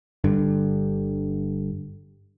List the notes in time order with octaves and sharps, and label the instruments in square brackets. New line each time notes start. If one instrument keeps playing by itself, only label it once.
[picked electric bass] G1 G2 D3